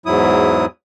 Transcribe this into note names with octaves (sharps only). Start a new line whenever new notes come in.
E2 G#2 F#3 E4 D#6